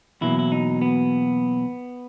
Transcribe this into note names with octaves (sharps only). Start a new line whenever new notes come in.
E2 B2 F#3 A#3 E4
E4
D#4
B3